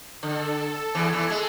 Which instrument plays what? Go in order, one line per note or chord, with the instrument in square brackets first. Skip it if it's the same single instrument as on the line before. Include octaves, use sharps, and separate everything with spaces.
[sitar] D3 [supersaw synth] A4
[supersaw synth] A4
[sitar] E2 E3
E2 E3
G#3